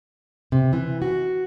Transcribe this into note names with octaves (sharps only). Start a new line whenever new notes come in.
C3
E3
F#4